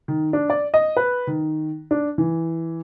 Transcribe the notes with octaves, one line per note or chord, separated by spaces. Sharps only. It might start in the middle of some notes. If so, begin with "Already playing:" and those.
D#3
D4
D5
D#5
B4
D#3
D4
E3